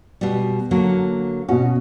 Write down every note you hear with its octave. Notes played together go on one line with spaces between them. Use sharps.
B2 G3
D3 F#3 A#3
B2 C#4 F#4